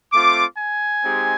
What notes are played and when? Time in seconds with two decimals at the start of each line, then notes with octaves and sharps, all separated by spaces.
0.13 A3 C4 F4 D6
0.58 G#5
1.03 G#3 C4 D#4 G4